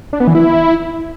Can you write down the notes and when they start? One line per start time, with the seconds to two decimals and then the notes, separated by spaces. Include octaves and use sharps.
0.13 D4
0.20 B3
0.27 E3
0.35 E4